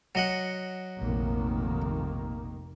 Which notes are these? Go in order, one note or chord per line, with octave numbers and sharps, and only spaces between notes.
F#3 D#5 F#5
F1 A#1 B2 D#3 A#3